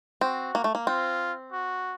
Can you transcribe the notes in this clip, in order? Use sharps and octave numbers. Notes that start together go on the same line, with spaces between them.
C4 F#4
A#3
A3
A#3
C4 F4
F#4